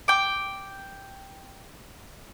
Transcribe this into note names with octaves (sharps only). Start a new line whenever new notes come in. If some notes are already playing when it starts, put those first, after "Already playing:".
G5 D6